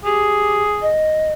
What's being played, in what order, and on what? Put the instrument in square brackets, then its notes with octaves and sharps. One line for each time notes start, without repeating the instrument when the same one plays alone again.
[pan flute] G4 [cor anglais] G#4
[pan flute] D#5